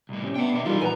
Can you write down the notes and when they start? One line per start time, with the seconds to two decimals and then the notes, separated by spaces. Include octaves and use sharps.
0.09 C2 A2
0.24 C4 C#4 G4
0.36 B3 D4 E5 G5
0.54 B2 C5
0.65 E3 G3 D#4 F4 G#4 A#4
0.81 A#1 B4 F#5 G#5 A#5